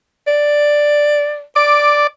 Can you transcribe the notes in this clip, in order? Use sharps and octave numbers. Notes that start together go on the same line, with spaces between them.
D5
D5 D6